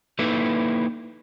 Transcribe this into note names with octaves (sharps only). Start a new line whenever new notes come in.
A#3 D#4 E4 A4 B4